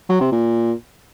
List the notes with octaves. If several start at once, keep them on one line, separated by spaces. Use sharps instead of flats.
F#3
C3
A#2